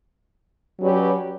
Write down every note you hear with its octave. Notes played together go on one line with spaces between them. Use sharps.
F#3 C#4 G4 B4 D5